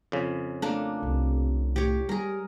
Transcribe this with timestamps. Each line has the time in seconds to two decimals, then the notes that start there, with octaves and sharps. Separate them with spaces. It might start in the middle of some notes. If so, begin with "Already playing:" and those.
0.12 F2 C#3
0.62 A3 A#3 D4
1.03 C2 C3
1.76 A2 G4 C#5
2.09 G3 G#4 A#4